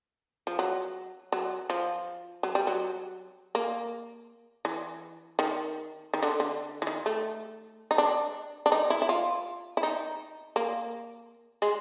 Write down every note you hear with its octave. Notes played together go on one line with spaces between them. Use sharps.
F3
F#3
F#3
F3
F#3
G3
F#3
A#3
E3
D#3
D#3
D3
D3
E3
D#3
A3
D#4
D4
D4
D#4
E4
E4
F4
E4
D#4
A#3
G#3